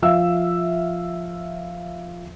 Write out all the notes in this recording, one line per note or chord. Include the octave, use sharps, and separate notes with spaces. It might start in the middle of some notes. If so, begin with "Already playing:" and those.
F3 E5 F5 E6